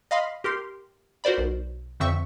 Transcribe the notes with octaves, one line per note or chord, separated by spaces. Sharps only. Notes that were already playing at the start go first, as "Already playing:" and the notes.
D#5 F5 B5 C6
G4 A#4 C6
F#4 A#4 C5 D5 B5
B1
F2 D3 C4 E5 C#6